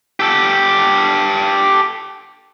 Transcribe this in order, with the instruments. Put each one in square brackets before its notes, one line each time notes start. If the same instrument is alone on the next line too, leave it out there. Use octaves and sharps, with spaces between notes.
[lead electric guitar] G4 A4